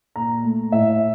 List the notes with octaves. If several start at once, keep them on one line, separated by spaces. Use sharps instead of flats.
A#2 A#5
A3
A2 E5